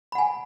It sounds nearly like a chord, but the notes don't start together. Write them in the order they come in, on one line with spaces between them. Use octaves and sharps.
B5 F#5 G#5